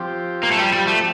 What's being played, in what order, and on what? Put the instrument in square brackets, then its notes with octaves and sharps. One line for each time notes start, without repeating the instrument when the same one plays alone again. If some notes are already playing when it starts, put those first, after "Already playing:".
Already playing: [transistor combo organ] F3 C4 G4
[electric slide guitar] A#3
A3
G3
G3
A3